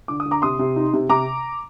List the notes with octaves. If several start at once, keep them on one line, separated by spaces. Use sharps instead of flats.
D3 D6
D#6
D3
A#5 D6
C3 C6 D#6
C3
D#4
C3
C3 A#5 D6